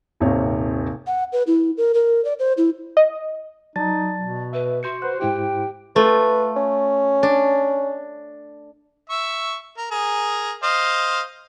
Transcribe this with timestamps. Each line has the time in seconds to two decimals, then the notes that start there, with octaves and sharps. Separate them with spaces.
0.20 D#1 G#1 C3 C#5
1.06 F#5
1.33 B4
1.47 E4
1.77 A#4
1.94 A#4
2.25 D5
2.39 C5
2.57 E4
2.97 D#5
3.76 F#3 D#4 D5 A5 A6
4.21 B2
4.53 B4 E5
4.83 F#4 C6 G6 C#7
5.02 B4 C5 F#5 F#6
5.20 G#2 E4 G4 C5 G5
5.96 A3 F4 B4
6.56 C#4
7.23 D4
9.10 E5 C#6
9.78 A#4
9.91 G#4 A#4
10.63 C5 D#5 F5